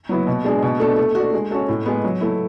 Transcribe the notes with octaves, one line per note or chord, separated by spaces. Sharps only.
F#3 B3 E4
B2
G#3 D4 G#4
B2
A3 D4 A4
A3
D4 F#4
G#3
C#4 F#4 A4
A2
G#3 B3
F#3
A3 E4